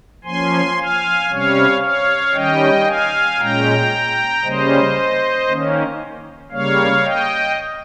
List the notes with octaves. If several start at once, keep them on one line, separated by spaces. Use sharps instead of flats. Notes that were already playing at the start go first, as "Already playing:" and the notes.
F3 A#3 C#4 G#5 C6
F5 G#5
C3 G3 C#4 C#5 F5
C#5 F5
D#3 G3 C#4 D#5 G5
F5 G#5
A#2 G#3 C#4 G5 A#5
C#3 G3 A#3 C#4 C5 D#5
D#3 A#3 C#4
C#3 G3 A#3 C#5 F5
D#5 G5